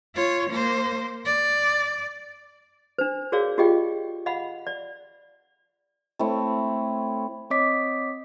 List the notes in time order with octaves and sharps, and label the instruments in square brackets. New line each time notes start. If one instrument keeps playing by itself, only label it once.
[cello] F4 C#5
A#3 C5
D5
[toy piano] D4 C5
F#4 G#4 A#4 C#5 D5 F5
F4 G4 G#4 D#5 F5 G5
D#5 F5 F#5 B5
D5
[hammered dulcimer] A3 C4 E4 C#5
[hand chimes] C4 C#5 D#5 D6 B6